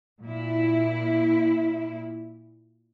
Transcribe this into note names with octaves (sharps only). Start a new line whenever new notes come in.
A#2 E4